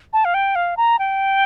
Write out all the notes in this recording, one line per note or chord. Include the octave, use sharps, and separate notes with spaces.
A5
F5
G5
F5
A#5
G5